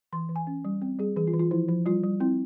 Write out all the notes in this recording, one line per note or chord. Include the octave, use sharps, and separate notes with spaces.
E3 C6
E3
G#5
C#4
G3
C4
G3 G#4
E3 G#4
F4
E3
F4
F3 E4
F3
G3 F4
G3
C4 E4